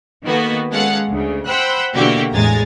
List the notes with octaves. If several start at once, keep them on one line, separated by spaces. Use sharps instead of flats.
D#3 A#3 B3 F#4 A4
G#3 B3 C#4 A4 F5 F#5
D2 C#3
C5 F#5 G5 B5 E6 F#6
B2 D3 E3 A#3 F#4 G4
A1 E2 G#3 G#5 A#5 A6